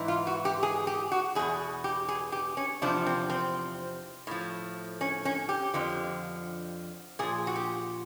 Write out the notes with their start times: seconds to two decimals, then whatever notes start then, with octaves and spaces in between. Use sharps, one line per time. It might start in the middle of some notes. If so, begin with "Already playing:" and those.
Already playing: G#2 E3
0.08 F4
0.27 F#4
0.45 G4
0.63 G#4
0.87 G4
1.12 F#4
1.35 E2 G#4
1.39 B2
1.84 G4
2.08 G#4
2.32 G4
2.57 C#4
2.82 E2 C3 F3 D4
3.07 C4
3.30 C4
4.27 A2 F3
5.01 C#4
5.25 C#4
5.49 G4
5.74 F2 D3 F3
7.19 A#2 F3 G#4
7.47 F#4
7.56 G4